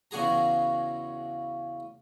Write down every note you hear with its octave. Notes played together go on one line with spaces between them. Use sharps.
E2 C#3 F#4 G#4 A#5